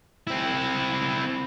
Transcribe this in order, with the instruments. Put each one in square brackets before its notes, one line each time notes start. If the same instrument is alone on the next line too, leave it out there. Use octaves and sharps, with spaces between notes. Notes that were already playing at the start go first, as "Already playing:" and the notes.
[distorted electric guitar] C4 E4